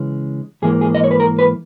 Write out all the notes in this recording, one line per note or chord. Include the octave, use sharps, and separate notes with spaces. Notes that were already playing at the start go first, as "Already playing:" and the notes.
Already playing: C#3 E3 G#3 C#4
G#2 E3 A#3 G#4
G#4
D#5
C#5
B4
A#4
B4